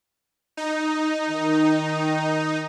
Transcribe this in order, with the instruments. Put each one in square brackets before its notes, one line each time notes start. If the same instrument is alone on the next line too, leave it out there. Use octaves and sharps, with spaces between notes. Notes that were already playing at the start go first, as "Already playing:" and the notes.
[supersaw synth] D#4
[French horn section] D#3